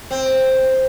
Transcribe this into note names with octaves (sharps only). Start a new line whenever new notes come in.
C4